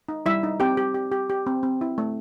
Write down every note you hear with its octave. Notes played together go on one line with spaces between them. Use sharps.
D#4
G3 E4 E5
D#4
C4 G4 G5
G4
G4
G4
G4
C4
C4
E4
A3